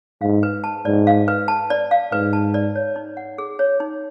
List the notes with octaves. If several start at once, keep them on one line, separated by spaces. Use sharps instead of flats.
G#2 F5
B4
A5
G#2 D5
F5
B4
A5
D5
F5
G#2 B4
A5
D5
C#5
D#4
F#5
G#4
C#5
D#4